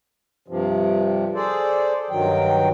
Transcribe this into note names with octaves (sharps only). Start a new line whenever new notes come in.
G2 C3 F3
G#4 A4 C5 D5
G2 D#3 F#3 G5